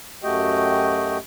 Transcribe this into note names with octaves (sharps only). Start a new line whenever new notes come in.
F#2 A3 F#4 G4 D#5 G5